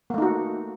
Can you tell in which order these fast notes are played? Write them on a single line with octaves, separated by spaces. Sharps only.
A#3 A3 D#4 F#4